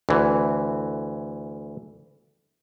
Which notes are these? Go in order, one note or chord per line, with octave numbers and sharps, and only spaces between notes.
D2 E3